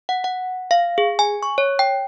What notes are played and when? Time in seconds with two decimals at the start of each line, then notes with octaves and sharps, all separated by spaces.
0.09 F#5
0.24 F#5
0.71 F5
0.98 G#4
1.19 G#5
1.43 C#6
1.58 C#5
1.79 G5